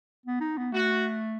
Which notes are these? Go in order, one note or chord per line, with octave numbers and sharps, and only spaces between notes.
B3
D#4
B3
A3 F#4